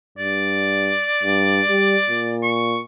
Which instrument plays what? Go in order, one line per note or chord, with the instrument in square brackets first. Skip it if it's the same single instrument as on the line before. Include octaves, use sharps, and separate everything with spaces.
[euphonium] G2 [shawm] D5
[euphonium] G2
G3
A#2
[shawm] C#6